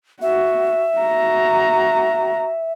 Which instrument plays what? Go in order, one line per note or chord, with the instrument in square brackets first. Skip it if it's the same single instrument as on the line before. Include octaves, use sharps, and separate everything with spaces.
[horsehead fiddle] F#4 [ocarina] E5
[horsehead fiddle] F#4 A#5